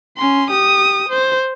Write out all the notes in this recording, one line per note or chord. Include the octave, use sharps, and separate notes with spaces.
C#4 C6
G4 D#6
C5